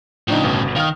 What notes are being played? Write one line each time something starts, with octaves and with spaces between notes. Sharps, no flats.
A2 C#3 F3 D4 D#4
G1 B2
D#3 F5 F6